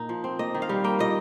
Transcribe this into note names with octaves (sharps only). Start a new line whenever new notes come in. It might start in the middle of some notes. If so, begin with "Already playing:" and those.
Already playing: A#2 D#4
F3
C4
A#3 D#5
D#3
F5
G3
A#3 G5
A#2 D#5